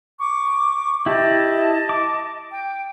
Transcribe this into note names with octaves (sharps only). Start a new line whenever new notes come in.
C#6 D6
E4 G4 D#5 A5
D6
G5